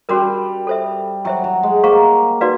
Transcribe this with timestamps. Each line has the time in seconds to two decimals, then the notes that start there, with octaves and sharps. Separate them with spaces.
0.09 G3 C#4 F#4 A#4
0.67 A4 C5 E5
1.25 F#3 C5 E5 G5
1.44 F#3
1.63 G#3
1.83 A#3 C5 F5 A#5 C#6
2.41 D#4 F#4 B4 D5 F5